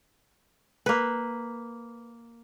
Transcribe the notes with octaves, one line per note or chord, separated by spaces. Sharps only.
A#3 B4